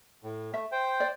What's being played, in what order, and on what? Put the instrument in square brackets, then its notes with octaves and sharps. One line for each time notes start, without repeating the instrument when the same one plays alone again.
[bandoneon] A2
[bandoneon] A3 [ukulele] E5
[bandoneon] C5 G5
[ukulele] D5